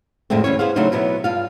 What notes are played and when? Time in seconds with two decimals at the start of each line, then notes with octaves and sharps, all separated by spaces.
0.30 F2 A2 D3 G#3 A3 C4
0.44 D2 E3 C#4 C#5
0.59 B3 G#4 C5 F5
0.76 C#3 F#3 A3 D4 D#4 C5
0.92 B2 F#3 B3 E4
1.24 G2 F4 F5